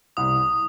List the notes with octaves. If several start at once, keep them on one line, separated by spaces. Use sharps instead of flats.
C2 D#6